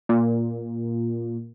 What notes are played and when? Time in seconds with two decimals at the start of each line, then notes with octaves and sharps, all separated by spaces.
0.09 A#2